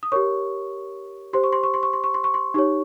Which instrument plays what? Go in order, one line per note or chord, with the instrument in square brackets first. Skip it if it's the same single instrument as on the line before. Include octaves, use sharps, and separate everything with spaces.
[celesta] D#6
G4 A#4 C#5 C#6
G4 C5 C6
C#6
C6
C#6
C6
C#6
C6
C#6
C6
C#6
C6
D#4 G4 C#5 C#6